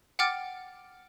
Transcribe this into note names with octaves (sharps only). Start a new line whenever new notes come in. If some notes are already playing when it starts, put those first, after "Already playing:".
F#5 G5 D6 F6 A6